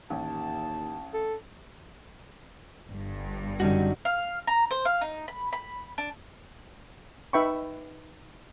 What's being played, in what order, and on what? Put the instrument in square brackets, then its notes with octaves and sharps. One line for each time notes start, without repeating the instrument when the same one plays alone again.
[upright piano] A1 [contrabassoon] D#2 [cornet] A5
[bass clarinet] A4
[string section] G1 G2
[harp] F#2 D3 [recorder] G3 [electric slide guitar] C#4 D#4 F#4
[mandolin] F5
A#5
C5
F5
D#4
B5
B5
D4
[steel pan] D#4 B4 E5 G5 B5 C#6